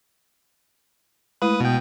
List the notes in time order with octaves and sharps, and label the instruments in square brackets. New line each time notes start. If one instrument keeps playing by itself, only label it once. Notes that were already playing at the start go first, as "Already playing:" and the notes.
[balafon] G#3 A3 E4 [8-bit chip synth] B4 D#6
[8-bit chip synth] B2 G5